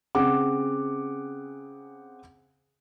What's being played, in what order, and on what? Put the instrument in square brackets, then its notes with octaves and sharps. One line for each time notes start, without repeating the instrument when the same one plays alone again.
[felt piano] C#3 C4 G#4 F#5 D6